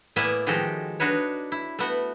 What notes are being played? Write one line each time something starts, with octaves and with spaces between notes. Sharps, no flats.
A2 A#3 B3 D5 E5 G#5
D#3 F3 G#3 F#4 G4 A4
D4 D#4 F#4 B4 C#5
E4
A3 B3 F#4